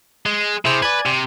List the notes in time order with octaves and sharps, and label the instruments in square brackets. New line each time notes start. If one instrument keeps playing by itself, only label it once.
[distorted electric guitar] G#3
[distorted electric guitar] C3 [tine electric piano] E4 G#4 C5
[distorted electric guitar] B4 [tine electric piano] D5 G#5 G#6
[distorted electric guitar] C3